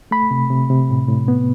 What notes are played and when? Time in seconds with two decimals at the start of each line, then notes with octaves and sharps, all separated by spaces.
0.11 A3 B5
0.31 C3
0.50 C3
0.70 C3
0.90 A2
1.09 A2
1.28 B3